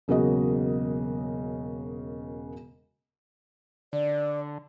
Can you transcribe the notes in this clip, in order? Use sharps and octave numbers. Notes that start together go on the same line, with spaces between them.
E1 C#3 F#3 A#3 F#4 D#5
D3 D5